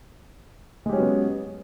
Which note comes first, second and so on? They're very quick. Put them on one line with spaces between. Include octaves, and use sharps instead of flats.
G#3 G4 C#4 F#3 B3